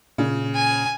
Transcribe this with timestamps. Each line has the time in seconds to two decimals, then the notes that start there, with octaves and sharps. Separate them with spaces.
0.18 A#2 C#3
0.54 G#5